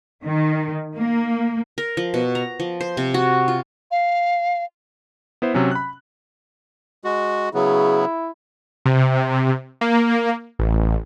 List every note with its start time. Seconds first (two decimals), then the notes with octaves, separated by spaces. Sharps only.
0.24 D#3
0.97 A#3
1.78 A#4
1.97 F3
2.14 B2
2.35 A#5
2.60 F3
2.81 C5
2.97 C3
3.14 F#4
3.48 F4
3.91 F5
5.42 B3 E4 C5
5.54 C3 F#3 C#4
5.71 B5 F#6
7.04 G#3 F#4
7.54 C#3 F#3 B3 E4 G#4
8.86 C3
9.81 A#3
10.59 A1